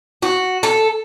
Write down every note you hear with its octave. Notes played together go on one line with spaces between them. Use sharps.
F#4
A4